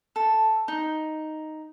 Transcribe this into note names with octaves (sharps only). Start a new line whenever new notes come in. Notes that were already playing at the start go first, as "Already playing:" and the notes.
A4
D#4